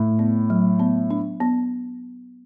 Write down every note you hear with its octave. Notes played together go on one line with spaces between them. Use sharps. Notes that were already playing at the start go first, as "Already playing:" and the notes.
Already playing: A2
B3
F#3
B3
D4
B3